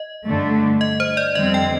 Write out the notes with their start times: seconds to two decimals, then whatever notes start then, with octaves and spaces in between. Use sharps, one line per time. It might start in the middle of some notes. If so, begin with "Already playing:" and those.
Already playing: D#5
0.27 G2 D3 A3 D4
0.81 D#5
1.00 C5
1.17 D5
1.35 F2 D3 G3 C4 D#5
1.54 G5